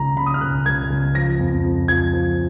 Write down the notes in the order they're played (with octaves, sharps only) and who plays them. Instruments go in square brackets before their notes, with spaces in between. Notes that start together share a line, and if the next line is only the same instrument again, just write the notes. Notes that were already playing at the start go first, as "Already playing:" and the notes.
Already playing: [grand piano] C#2 C#3 A#5
C#3 B5
D#6
F6
C#2 F#6
C#2 G#6
C#2
F3 A#6
F2
F2
F3 G#6
F3